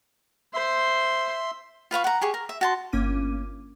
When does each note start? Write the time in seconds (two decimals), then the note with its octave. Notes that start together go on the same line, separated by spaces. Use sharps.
0.54 C5 E5 C6
1.91 F4 B4 F5 C#6
2.04 F#5 A#5
2.21 G4 G#4 C#6
2.34 A#4
2.49 E5
2.61 F#4 A5 C6
2.92 G1 A#3 C#4 D6 D#7